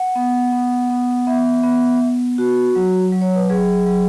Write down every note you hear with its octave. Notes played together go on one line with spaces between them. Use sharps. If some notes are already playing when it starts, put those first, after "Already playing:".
Already playing: F#5
B3
B3
B3
B3 E5
B3
B3
F#4
F#3
F#3
C#5
B4
F#3 G#4
F#3